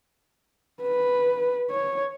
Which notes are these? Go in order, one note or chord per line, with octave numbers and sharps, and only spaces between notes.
B4
C#5